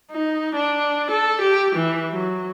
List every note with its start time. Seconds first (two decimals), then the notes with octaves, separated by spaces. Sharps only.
0.11 D#4
0.56 D4
1.11 A4
1.41 G4
1.75 E3
2.13 F#3